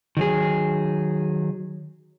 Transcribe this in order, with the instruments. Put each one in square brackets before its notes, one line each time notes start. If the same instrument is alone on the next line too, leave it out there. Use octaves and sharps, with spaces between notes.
[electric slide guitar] D#3 F#3 G#4